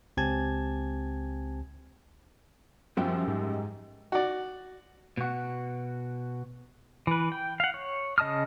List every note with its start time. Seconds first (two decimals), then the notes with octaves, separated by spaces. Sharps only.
0.17 C#2 C4 G4 G#5 A5 G#6
2.97 F#2 F3 G3 F#4 G4
3.27 G#2
4.12 F#4 D5
5.17 B2 F#4
7.07 E3 B4
7.32 G5
7.60 F5 F#5
7.74 C#5
8.18 C#3 D#5 A5 D#6 F6